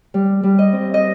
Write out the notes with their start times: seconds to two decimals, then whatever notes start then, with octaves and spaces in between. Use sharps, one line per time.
0.14 G3
0.43 G3
0.59 D#5
0.73 C4
0.94 D#5